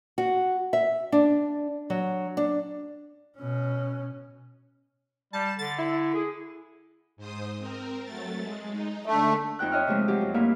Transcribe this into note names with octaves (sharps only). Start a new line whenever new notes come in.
F#4
E5
D4
F#3
D4
B2 C#4
G3 A5
D3 A6
E4
G#4
G#2 C5 D#6
C4 A#4
F#3 A3 A6
G#3
D#4
D3 A3 D4
F2 D#4 G5 F#6
C#5 D#5 E5 F6
C3 F3 G#3 A3 C4
F3 F#3 G4
F#2
G2 A3 A#3 E4 F5